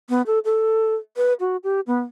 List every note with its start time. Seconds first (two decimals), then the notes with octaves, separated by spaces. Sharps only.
0.09 B3
0.27 A4
0.45 A4
1.17 B4
1.40 F#4
1.64 G4
1.87 B3